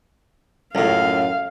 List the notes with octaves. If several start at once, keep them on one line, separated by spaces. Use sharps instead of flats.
C#2 F#2 A2 F5